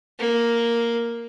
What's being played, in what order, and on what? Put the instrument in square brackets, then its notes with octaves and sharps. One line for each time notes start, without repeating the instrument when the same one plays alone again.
[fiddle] A#3